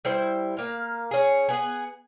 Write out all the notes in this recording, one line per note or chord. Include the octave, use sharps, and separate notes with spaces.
G3 E4 C5
A#3 F5
C#4 G#4
B3 G#4